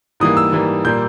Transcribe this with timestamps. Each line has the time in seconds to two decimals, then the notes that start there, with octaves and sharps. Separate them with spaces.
0.20 G#2 E3 G3 A#3 D#6
0.37 E6
0.52 G#2 E3 G3 A#3
0.85 A#2 G3 A#3 G6